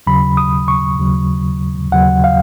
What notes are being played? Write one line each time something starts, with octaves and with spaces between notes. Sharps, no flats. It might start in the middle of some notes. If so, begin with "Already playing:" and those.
D#2 C#3 F#3 B5
D#6
C#6
D#2 C#3 F#3
D#2 C#3 F#3 F#5
F5